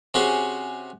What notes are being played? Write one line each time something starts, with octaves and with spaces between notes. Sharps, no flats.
C3 C#4 F#4 G#4 C5